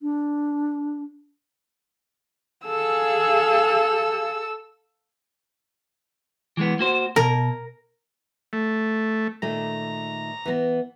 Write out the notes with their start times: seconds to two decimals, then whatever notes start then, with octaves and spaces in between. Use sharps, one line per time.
0.01 D4
2.66 G#4 A4 F5 E6
6.57 E3 G#3 B3
6.79 A#3 F#4 C5
7.16 B2 A#4
8.53 A3
9.42 A#2 D#3 A3 A#5
10.45 E3 B3